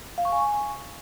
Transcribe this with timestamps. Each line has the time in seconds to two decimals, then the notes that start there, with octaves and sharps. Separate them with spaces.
0.18 F5
0.25 C#6
0.32 G#5